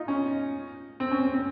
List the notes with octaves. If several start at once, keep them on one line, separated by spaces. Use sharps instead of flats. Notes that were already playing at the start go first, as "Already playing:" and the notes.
Already playing: D#4 F4
C#4
C4
C#4
C4
C4